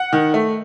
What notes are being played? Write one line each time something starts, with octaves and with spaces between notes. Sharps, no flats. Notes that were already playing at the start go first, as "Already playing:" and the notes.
Already playing: F#5
D#3
A3